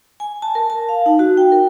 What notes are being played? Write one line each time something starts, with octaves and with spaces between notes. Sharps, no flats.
G#5
A5
A#4
A5
F5
D#4
F#4
G5
A#4